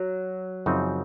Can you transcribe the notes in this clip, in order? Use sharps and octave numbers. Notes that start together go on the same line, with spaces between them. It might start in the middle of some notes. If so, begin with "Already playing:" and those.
Already playing: F#3
F#2 C#3 F3 C4 D#4